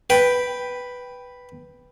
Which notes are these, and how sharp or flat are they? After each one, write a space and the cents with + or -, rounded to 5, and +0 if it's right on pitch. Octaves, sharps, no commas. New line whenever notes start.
B4 +0 G5 +0